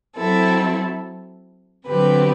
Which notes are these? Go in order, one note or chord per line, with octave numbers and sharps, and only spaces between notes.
F#3 C4 E4 A4
D3 F#3 C4 G4 B4